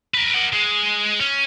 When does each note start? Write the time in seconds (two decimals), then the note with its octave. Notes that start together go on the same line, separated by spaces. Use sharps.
0.14 A#4 B4
0.34 A#4 F#5
0.53 G#3
1.19 C#4